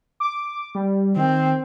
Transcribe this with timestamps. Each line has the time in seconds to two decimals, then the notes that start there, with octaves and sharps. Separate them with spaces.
0.20 D6
0.75 G3
1.17 D#3 C4